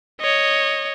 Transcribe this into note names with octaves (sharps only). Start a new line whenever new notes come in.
C#5 D#5